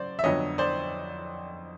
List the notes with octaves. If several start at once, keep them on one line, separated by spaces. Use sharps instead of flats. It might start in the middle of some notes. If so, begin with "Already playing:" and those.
Already playing: C#3 F#3 C5 D5
E5
F2 D3 F#3 B3 D4 C#5 D#5
C5 D5